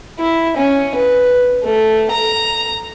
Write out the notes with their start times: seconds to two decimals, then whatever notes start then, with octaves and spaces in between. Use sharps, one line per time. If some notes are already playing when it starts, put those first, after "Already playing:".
0.20 E4
0.57 C#4
0.95 B4
1.64 A3
2.11 A#5